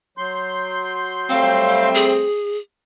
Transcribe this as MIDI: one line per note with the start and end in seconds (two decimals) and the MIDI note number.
0.17 1.91 54
0.17 1.91 84
0.17 1.91 91
1.30 2.24 55
1.30 2.24 57
1.30 2.24 60
1.30 1.89 77
1.94 2.58 68